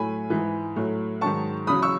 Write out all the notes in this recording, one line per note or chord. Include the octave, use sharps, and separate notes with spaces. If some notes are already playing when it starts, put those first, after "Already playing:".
Already playing: A2 F#3 A3 G#5 B5
G#2 E3 G#3
A2 F#3 A3
G#2 D#3 F#3 A5 C#6
E2 C#3 F#3 B5 D#6
C#6 E6